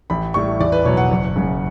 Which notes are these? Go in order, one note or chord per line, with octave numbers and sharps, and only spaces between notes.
A1 B5
A2 G3 C#6
E2 D5
B4
B2 F#3 C#5
F#5
F#1
F#2 C#3